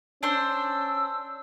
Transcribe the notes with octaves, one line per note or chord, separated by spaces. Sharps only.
C#4 D4 C5 E6